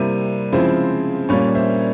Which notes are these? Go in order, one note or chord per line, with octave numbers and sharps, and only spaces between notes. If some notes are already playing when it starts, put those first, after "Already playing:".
Already playing: C3 G3 A#3 E4 C5
C#3 F3 G#3 C4 E4 C5
A#2 G3 A#3 C#4 C#5
C5 E5